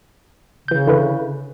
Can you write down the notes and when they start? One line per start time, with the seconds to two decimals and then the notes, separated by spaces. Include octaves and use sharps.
0.68 C#3 E3 G6
0.87 D3 E4 B4